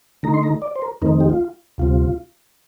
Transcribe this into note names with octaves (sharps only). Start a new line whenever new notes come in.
D3 A3 D#4 A#5
C6
A#5
D5
C5
A#4
F2 D#3 A3 C4 D#4 A#4
G4
F4
D2 C3 G3 C4 F4